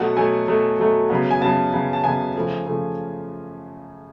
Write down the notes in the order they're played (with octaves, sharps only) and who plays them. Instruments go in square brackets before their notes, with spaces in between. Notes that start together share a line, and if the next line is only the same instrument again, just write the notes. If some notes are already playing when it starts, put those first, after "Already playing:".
Already playing: [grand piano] B2 F#3 A3 F#5
B2 F#3 A3 G#5
B2 F#3 A3
B2 F#3 A3
F#2 C#3 F#3 B3
G#5
F#2 C#3 F#3 B3 A5
F#2 C#3 F#3 B3
A5
F#2 C#3 F#3 B3 G#5
C#3 F3 A3
C#3 F3 A3